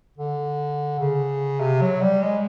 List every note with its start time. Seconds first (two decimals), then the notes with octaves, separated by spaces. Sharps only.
0.17 D3
0.99 C#3
1.60 C3
1.81 F#3
2.01 G3
2.22 G#3